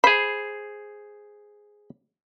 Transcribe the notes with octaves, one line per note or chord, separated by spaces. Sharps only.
G#4 C5 B5